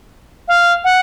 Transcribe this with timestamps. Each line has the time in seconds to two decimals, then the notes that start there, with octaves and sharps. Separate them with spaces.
0.48 F5
0.84 F#5